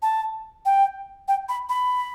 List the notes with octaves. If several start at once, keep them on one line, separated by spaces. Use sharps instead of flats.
A5
G5
G5
B5
B5